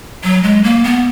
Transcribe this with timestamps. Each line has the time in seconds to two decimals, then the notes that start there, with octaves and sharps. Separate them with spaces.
0.24 F#3
0.43 G#3
0.64 A#3
0.84 B3